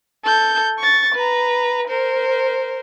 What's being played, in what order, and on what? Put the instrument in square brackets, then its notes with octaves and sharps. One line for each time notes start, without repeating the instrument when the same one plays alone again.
[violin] A4 G6
C#6 A6
B4 A#5
A#4 C5